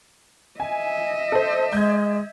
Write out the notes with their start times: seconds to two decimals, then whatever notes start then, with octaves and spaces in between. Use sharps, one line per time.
0.60 D#5 E5 G#5
1.32 A4 C5
1.73 G#3 G6 G#6